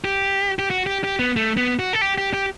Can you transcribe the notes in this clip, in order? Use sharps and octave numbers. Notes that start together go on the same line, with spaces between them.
G4
G4
F#4
G4
G4
B3
A3
B3
F#4
A4
G4
G4
G4